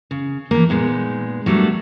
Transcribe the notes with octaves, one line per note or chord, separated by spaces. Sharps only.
C#3
E3 F3 A#3
A#2 G#3 B3 D#4
F#3 G3 A3 A#3 D4